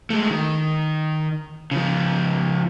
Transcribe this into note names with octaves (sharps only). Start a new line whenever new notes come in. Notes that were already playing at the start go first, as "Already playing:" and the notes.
G#3 A3
D#3
C#3 F3